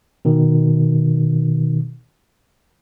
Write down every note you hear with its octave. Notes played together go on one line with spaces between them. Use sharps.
B2 D#3